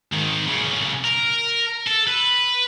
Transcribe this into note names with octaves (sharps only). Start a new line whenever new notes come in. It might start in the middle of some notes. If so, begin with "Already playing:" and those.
G#2 D#3
B1 C#3
A#4
A4
B4